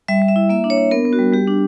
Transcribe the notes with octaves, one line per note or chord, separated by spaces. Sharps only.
G3 E5
G3
E5
E4
A#3 E5
D4
C#5
D4
B3 A#4
B3
F#4
G3
G3 G4
D4